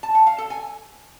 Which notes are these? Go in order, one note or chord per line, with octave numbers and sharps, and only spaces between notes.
A5
F#5
F5
A4
G#5